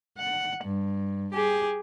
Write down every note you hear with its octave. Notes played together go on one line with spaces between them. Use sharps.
F#5
G2
G4 G#4